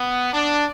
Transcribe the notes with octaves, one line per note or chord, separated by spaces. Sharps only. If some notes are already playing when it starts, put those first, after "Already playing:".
Already playing: B3
D4